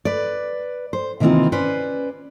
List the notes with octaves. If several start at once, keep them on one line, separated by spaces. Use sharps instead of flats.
B4 D5
C5
C3 D#3 E3 A#3 C4 F4
C#4 B4 C5 D5